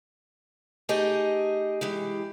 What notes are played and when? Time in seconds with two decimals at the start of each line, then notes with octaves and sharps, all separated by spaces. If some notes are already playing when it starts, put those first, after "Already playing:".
0.89 A3 D#4 G4 G#4 D#5
1.81 E3 G#3 G4